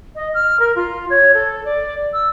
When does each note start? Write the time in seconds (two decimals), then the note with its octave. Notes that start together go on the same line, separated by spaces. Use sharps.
0.15 D#5
0.34 F6
0.60 A#4
0.76 F4
1.10 C#5
1.34 A4
1.65 D5
2.13 E6